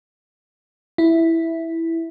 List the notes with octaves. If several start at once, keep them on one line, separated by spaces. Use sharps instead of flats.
E4